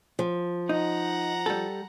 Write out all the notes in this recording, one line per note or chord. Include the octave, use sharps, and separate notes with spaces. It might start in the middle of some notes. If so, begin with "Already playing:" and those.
F3
D#4 F#5 A#5
G3 A4